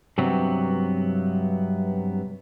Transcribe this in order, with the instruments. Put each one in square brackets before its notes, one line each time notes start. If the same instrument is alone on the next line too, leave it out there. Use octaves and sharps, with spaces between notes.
[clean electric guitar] G2 C3 F#3 B3 C4